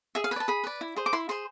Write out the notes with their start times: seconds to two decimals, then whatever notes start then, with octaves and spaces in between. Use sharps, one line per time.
0.15 G#4 E5
0.24 F5
0.31 B4 G#5
0.36 D5
0.40 A5
0.48 G#4 B5
0.64 B4 D5
0.81 E4
0.96 G#4 C5
1.06 D6
1.13 E4 C6
1.29 G#4 C5 C6